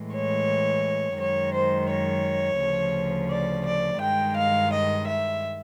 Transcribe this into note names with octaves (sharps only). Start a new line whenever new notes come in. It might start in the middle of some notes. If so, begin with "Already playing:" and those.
Already playing: A2 E3 G#3
C#5
F#2 D#3 G#3 C#5
C5
C#5
D2 C#3 F3
D5
D5
G2 D#3 G#3 G5
F5
D#5
E5